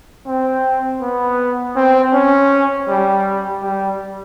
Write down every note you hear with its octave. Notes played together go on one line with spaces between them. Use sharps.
C4
B3
C4
C#4
G3
G3